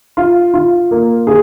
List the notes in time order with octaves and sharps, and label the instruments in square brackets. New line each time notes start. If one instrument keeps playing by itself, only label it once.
[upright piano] F4
F4
A#3
G#4